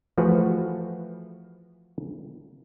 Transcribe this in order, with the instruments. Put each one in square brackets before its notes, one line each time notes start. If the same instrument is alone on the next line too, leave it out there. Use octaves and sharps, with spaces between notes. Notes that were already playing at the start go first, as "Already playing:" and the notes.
[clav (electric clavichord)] E3 F3 A3 F#4 G#4 B4